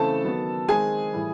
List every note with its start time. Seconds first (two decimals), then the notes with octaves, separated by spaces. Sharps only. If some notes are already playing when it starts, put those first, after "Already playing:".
Already playing: C#3 E3 A3 C4 A4 A5
0.24 D#3 F#3 B3
0.69 D#3 G#3 C4 G#4 G#5
1.13 A2 E3 G3